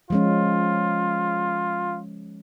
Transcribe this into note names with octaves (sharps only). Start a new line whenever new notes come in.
F3 G#3 C#4 F4